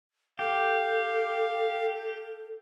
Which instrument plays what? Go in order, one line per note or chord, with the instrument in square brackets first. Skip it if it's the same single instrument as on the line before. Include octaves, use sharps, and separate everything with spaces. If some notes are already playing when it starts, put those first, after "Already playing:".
[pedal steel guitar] G4 [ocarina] A4 [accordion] F5